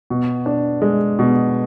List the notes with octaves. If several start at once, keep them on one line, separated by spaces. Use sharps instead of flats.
B2
D4
G#3
B2